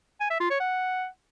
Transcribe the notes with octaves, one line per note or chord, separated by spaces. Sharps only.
G#5
E5
F4
C#5
F#5